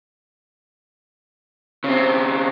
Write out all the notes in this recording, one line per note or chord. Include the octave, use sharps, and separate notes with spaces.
C#3 C4